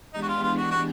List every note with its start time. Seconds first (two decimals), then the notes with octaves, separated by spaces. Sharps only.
0.14 E3 G#3 B3 D4 D#4 G4
0.22 F#4
0.28 F4
0.42 F4
0.57 F#4
0.71 F#4